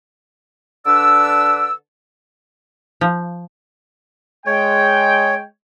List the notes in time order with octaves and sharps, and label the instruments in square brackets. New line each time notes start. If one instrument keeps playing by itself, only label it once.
[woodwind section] D3 D4 B4 D5 E6
[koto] F3
[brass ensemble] G#3 G5 [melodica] C#5